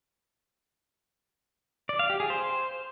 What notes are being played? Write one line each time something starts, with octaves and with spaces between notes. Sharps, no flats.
D5
F5
G4
G#4
C5